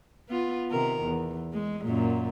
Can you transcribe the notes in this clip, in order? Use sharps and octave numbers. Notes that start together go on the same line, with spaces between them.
B3 F4
C3 D#3 A#4
E2
G#3
F#2 A#2